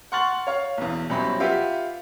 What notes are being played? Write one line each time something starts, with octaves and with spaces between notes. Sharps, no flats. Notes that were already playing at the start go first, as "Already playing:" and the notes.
F#5 C6 C#6 F6 A6 F#7
C#5 F5 C#6
B1 E2
C2 B2 F#3 C4 C#4 B5
F4 G4 B4 E5 F#5